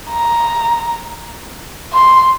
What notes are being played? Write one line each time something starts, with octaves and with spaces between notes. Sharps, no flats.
A#5
C6